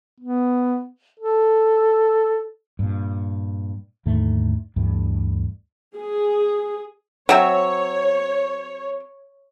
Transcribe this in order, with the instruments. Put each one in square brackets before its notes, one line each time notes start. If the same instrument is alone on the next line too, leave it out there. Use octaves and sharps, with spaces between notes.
[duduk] B3
A4
[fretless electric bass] G2 A#2
D#2 G#2 D3 A3
D2 G2 D3 E3
[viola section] G#4
[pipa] F#3 C4 E5 [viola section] C#5